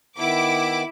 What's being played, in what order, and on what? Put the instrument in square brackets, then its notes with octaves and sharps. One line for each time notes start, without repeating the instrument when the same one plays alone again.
[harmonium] D#3 B3 [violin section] E4 D6